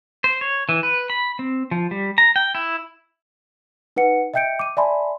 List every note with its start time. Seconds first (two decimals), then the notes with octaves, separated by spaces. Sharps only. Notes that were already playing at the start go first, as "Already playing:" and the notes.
0.24 C5
0.41 C#5
0.69 E3
0.83 B4
1.10 B5
1.39 C4
1.71 F3
1.91 G3
2.18 A#5
2.36 G5
2.55 E4
3.96 D#4 B4 F#5 C#7
4.34 D#5 E5 G5 G6 C#7 D7
4.59 D6 D#7
4.77 D5 E5 G#5 A5 B5 C6